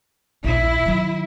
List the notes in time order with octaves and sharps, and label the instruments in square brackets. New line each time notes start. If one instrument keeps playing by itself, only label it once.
[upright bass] A#1 D#2 [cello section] E4
[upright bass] D#3 F#3